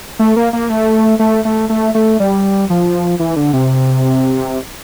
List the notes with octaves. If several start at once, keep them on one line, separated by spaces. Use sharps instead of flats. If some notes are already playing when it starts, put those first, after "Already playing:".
A3
A#3
A#3
A3
A3
A3
A3
A3
G3
F3
E3
D3
C3